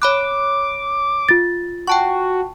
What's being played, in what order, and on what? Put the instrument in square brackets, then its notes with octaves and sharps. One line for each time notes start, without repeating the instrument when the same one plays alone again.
[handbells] C#5 B5 F#6 [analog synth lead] D6
[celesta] F4 A6
[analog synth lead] F#4 [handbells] G5 A5 C#6